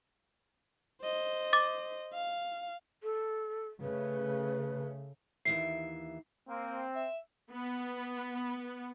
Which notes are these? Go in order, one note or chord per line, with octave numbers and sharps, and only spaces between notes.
C5 D#5
D6 A6
F5
A4
C#3 A3 B4
D#2 E3 E5 C7
A#3 C4
E5
B3